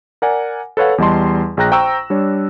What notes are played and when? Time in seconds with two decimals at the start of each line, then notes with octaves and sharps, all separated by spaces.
0.22 A#4 D5 F#5 G#5
0.77 A4 B4 C#5 F5 F#5
0.98 E2 G3 D#5 A5 C6
1.57 A#1 G#4 G5 A#5 F#6 A#6
1.71 C5 G5 A#5 C#6 E6
2.10 G3 D4 C#5